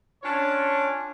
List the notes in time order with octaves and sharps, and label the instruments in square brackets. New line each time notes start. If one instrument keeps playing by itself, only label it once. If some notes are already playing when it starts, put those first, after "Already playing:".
[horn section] C#4 D4 F4 C#5